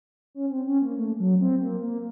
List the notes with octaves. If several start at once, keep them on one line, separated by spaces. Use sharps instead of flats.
C#4
C4
C#4
A#3
A3
F#3
C4
A#3
A#3